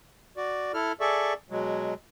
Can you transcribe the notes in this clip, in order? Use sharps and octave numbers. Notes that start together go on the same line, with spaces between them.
F#4 D5
E4 A4 F6
G#4 A4 D5 E5 C#6
B2 F#3 G#3